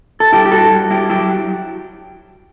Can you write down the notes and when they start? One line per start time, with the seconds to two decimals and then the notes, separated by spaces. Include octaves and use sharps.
0.20 A4
0.32 G2 E4 G4
0.46 G4
0.52 G2 F#4 A4
0.71 G3
0.90 G2 E4 G4
1.09 F#3 E4 G4
1.29 F#3